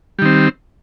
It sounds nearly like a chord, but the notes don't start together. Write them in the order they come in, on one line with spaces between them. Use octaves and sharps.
G3 D#3 C4